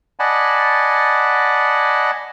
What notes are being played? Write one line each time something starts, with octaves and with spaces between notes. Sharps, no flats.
D5 D#5 F#5 G#5 A5 B5